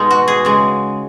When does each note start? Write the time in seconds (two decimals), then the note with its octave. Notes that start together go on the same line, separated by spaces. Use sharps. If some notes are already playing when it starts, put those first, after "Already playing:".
Already playing: B2 G#3 D#4
0.11 F#4
0.28 G#4
0.45 C#3 G#3